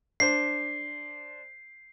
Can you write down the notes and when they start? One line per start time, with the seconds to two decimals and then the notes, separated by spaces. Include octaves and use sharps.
0.20 D4 C5 C7